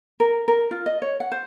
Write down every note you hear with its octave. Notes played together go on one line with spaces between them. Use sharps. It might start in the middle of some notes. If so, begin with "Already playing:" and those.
A#4
A#4
F4
D#5
C#5
F#5
C5